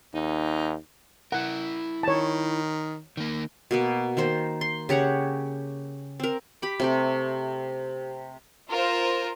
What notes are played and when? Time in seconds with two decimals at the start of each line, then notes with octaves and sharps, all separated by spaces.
0.14 D#2 D#4
1.32 E4 A#4 F#5
2.03 D#3 C#5 A5
3.17 D#3 A#3
3.71 B2 A#3 B3
4.17 D#3 A#3 C5
4.61 C6
4.89 C#3 G4 C#5 F#5
6.20 C4 A#4
6.62 G4 B5 D6
6.80 C3 A3 G4
8.71 F4 A#4 C5